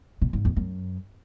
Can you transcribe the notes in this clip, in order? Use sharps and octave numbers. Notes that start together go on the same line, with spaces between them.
B2
G#2
E2
F#2